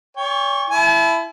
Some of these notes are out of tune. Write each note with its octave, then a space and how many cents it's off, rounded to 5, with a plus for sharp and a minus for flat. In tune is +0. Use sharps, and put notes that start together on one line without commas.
C#5 +45 G5 +45 C#6 -20
E4 +15 A5 -45